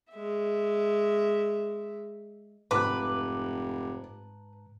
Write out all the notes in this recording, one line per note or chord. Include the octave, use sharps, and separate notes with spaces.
G#3 E5
F1 G#2 B4 A5 A#5 D6 F#6